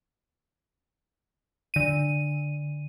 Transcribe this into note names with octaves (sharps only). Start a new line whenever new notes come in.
D3 D#7